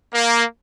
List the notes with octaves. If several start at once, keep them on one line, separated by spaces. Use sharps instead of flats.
A#3